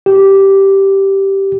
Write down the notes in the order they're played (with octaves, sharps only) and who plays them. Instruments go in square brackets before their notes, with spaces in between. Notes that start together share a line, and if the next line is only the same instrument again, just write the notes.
[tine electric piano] G4